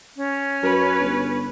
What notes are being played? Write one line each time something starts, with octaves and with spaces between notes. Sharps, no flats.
C#4
F#2 B4
G1